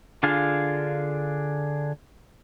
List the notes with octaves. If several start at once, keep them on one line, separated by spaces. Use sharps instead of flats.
D3 D4 F4 G#4 F5